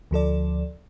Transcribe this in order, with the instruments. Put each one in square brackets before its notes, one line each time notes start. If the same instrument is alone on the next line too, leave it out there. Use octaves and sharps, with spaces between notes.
[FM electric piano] D2 F3 A4 D5